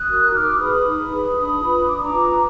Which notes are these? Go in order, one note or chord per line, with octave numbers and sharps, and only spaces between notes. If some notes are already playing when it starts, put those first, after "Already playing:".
Already playing: D#6 F#6
F#4 A#4
D#4 D6 F6
G#4 B4 B5 D#6
D#4
G#4 B4
D4 B5 D#6
F4 B4
D4 D6
D#6
A#5 D6
F4 B4